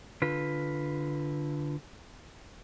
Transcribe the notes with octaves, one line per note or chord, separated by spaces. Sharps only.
D3 F4 B4